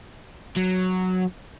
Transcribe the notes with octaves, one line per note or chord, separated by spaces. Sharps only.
F#3